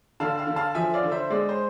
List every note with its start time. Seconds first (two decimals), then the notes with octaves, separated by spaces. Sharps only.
0.20 D3 F5 A5
0.38 F5 A5
0.47 D3
0.56 F5 A5
0.74 F3 E5 G#5
0.94 D5 F5
1.03 D3
1.12 C5 E5
1.30 G#3 D5
1.49 C5